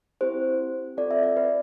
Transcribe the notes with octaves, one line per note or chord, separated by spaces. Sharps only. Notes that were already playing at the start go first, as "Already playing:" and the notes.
C4 E4 G4 C5
C4 F4 A4 D5
E5
D5
B4